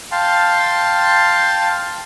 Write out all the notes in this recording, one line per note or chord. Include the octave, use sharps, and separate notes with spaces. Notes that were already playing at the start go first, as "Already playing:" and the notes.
F5 G5 A5 C6